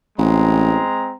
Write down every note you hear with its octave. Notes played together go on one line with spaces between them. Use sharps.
A1 G#3 C4 A#5